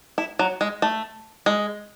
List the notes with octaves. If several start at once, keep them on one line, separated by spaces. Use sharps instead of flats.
E4
F#3
G#3
A3
G#3